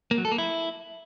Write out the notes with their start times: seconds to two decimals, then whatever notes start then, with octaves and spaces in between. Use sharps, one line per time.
0.11 A#3
0.18 F#3
0.25 A4
0.32 A#3
0.38 E4